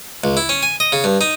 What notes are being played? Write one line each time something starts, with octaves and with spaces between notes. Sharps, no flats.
C#2
E4
C#4
G#5
D#5
C#3
G2
D#4